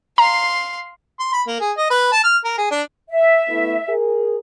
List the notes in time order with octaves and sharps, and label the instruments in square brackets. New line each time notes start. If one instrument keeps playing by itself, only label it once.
[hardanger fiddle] F5 C6 [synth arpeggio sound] A#5
[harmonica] C6
B5
A#3
G#4
D#5
B4
A5
F6
A#4
G#4
D4
[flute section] E5
[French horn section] A3 B3 E4
G#4 A#4